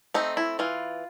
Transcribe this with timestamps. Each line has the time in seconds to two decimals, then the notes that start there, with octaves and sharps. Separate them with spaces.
0.14 A3 C4 D#4
0.37 E4
0.59 E3 F4